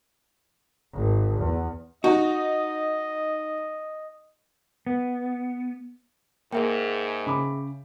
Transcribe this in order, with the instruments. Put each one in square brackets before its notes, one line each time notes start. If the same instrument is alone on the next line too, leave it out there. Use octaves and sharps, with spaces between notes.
[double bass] G#1
E2
[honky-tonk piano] D#4 [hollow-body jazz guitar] F#4 [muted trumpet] D#5
[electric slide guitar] B3
[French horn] G#2 [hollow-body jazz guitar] A#3 [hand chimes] G#4 E5 G5
[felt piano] C#3 B5 D6